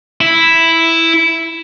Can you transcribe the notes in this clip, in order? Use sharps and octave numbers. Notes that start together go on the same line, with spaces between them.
E4